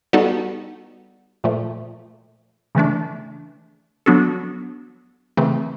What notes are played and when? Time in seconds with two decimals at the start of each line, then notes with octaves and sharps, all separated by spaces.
0.13 G3 B3 D#4 F#4 A4
1.44 A#2 F3 A3
2.75 C#3 E3 A3 D4
4.06 F#3 B3 D4 F#4 A4
5.37 C#3 E3 A3 C4